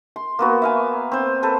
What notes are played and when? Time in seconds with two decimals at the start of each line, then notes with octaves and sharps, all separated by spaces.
0.16 C6
0.39 A#3 B3 F#4
0.62 E5 F5 G#5
1.12 C4 C5
1.43 A4 B4 C5